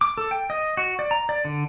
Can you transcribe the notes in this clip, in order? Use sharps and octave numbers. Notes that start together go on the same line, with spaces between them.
D6
A4
G5
D#5
F#4
D5
A#5
D5
D3